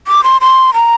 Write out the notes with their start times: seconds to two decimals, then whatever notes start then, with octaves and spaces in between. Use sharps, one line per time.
0.07 D6
0.24 C6
0.41 C6
0.74 A#5